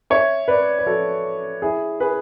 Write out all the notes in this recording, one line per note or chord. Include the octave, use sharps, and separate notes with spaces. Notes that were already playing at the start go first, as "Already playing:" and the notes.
C#5 E5
B4 D5
B4
F#4 A4
E4 G#4
G#4 B4